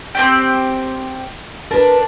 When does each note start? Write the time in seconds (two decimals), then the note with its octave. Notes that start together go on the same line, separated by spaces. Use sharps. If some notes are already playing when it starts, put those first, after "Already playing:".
0.15 C4 D4 G4
1.71 D4 A#4 B4